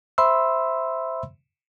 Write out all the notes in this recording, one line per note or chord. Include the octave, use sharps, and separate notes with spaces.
C5 E5 B5 C6 E6